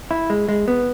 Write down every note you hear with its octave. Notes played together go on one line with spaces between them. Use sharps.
E4
G#3
G#3
B3